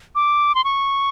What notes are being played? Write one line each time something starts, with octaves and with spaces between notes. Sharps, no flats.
D6
C6
C#6